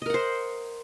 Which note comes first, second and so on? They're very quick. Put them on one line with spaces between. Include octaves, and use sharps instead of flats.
D#5 A#4 F#5 C5